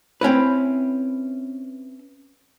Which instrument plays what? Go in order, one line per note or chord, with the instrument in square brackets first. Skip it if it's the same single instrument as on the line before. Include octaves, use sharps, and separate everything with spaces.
[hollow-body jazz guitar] C4 C#4 E4 B4